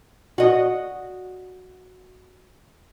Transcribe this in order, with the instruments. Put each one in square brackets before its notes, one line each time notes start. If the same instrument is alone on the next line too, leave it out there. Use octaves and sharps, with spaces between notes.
[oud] F#4 D#5